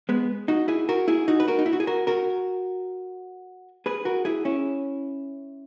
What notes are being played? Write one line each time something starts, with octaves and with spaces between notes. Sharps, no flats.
G#3 B3
D#4 F#4
E4 G#4
F#4 A#4
E4 G#4
D#4 F#4
B4
F#4 A#4
D#4
E4
F#4
G#4
F#4 A#4
F#4 A#4
G#4 B4
F#4 A#4
E4 G#4
C#4 E4